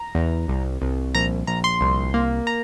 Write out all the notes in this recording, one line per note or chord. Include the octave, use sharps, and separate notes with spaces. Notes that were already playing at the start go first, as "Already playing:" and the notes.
Already playing: A#5
E2
C2
C2
A#1 A#5
A#1 A#5
C6
C2
A#3
A#5